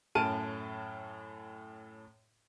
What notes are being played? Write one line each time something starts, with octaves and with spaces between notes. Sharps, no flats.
F#2 A2 A5 F6 D7 D#7